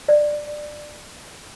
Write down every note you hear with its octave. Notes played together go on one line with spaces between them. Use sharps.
D5